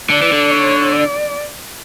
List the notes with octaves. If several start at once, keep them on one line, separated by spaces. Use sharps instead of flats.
D3 D5
E3
D3
C#5
D5